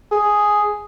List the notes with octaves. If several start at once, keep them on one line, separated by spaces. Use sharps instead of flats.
G#4